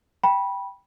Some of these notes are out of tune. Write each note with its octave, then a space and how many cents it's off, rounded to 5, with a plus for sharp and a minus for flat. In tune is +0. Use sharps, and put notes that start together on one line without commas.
G5 +0 B5 -15